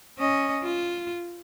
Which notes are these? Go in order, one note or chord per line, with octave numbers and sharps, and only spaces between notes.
C#4 D#5
F4